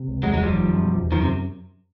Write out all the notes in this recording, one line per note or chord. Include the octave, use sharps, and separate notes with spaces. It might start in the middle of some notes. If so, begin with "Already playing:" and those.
Already playing: C3
C#2
E2 F#3 G#3
F#3 G#3
F#1
F3 G3
D#3
F#2
B2
E2
F#2 D#3 F3
C3